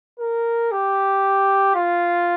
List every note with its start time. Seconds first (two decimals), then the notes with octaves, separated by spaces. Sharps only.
0.19 A#4
0.72 G4
1.75 F4